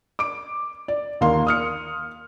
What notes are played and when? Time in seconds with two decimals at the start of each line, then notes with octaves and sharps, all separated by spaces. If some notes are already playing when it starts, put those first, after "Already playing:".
0.19 D6 D7
0.88 D5
1.21 D#2 A#3 F5 C6
1.47 D#6 F6 C#7